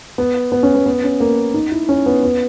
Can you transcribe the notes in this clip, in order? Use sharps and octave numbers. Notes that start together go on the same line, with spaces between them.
B3
B3
C#4
B3
B3
C#4
A#3
D#4
E4
C#4
B3
B3